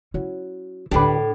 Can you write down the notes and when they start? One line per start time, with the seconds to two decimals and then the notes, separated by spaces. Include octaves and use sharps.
0.14 F#3 C#4 E4
0.91 D2 A2 D3 D4 G4 B4